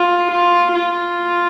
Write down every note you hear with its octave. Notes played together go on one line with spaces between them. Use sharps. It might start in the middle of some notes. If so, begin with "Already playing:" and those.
Already playing: F4
F4
F4